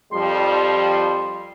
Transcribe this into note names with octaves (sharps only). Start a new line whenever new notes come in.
F2 F3 G3 C6